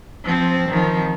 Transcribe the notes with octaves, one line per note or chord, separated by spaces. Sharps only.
F3 C4
D#3 F3